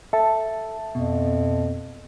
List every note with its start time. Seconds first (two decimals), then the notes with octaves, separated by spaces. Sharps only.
0.13 A4 E5 A5
0.95 F2 B2